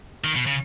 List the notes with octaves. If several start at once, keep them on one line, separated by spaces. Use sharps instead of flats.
D#3
B2
C#3